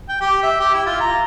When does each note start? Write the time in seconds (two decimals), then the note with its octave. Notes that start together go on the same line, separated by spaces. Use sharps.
0.09 G5
0.21 G4
0.43 E5
0.60 G4
0.74 E4
0.86 F4
1.01 A#5